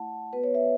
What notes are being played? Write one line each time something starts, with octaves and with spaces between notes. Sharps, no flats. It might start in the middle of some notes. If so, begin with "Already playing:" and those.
Already playing: A3 E4 F#5 A5
B3 F#4 B4
C#5
E5